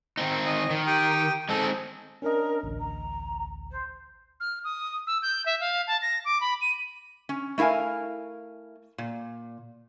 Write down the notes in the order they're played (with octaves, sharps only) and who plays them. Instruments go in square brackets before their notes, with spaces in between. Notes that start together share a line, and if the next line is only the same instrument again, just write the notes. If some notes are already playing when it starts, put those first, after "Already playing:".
[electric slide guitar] D#3 C4 D#4
[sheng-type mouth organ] D#5
[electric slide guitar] D#3
[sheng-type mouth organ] G4 G5 D#6
[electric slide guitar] G#3 C4 D#4 [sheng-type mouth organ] A4
[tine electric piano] C#4 D4 D#5 [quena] A#4
[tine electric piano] A1 D2
[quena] A#5
C5
[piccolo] F6
D#6
E6
G6
E5
F5
A5
A#6
D6
B5
D#7
[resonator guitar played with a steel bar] C#4
A3 E4 A#4 F5 G#5
A#2